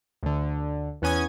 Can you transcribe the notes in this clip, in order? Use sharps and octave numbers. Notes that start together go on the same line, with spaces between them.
D2 D3
E2 B3 C#4 G#5 D#6 G#6